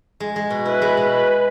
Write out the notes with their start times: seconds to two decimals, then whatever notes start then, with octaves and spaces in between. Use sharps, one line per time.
0.20 G#3
0.36 G#3
0.50 B2
0.65 E4 B4
0.82 G#3
0.97 B2